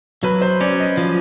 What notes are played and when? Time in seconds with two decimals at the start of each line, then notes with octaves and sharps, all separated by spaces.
0.23 F#3 B4
0.42 C5
0.60 C#4 D5
0.80 D#5
0.97 F3